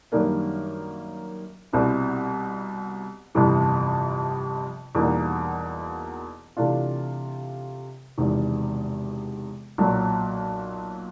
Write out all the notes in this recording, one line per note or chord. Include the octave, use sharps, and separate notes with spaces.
F#2 D#3 G3 A#3 D4
C2 B2 G3 C4 E4
G1 F2 C3 E3
E2 B2 G3 A#3 D#4
C3 E3 A3 D4 F4
E1 E2 C3 D#3
B1 A#2 F#3